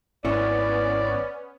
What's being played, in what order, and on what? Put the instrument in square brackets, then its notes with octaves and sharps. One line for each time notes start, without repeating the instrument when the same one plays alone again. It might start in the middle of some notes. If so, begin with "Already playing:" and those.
[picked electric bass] G#1 [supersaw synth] B3 C#4 [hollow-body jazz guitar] E4 C#5 [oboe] D5